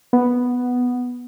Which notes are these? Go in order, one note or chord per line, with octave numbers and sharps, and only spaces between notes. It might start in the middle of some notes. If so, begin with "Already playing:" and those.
B3